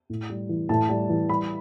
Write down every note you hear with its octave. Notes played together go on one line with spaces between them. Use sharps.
A2
G3
E3
A2 A5
G3
E3
G3 B5